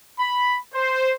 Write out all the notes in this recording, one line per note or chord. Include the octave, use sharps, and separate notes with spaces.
B5
C5